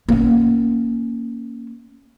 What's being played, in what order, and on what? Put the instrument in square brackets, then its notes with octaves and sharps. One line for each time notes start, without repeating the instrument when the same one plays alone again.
[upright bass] A#3 C#4